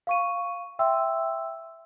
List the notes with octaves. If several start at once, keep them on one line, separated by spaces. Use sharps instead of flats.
F5 C#6 D#7
E5 G5 C6 E6